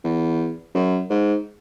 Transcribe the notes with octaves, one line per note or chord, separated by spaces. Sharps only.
E2
F#2
G#2